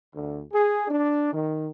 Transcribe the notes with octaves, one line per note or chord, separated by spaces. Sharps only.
D2
G#4
D4
D#3